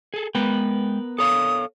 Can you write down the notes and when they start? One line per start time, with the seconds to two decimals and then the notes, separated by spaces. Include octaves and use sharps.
0.14 G#4 A4
0.35 G#3 B3 A#4 B4 G5
1.19 A4 C#5 F5 D#6